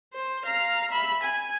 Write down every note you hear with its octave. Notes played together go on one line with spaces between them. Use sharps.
C5
F5 A#5
E5 B5
G#5